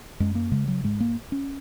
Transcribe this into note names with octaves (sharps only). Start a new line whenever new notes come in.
F#2 G#3
A#3
C#3 G#3
F#3
G#2 G#3
A#3
C#4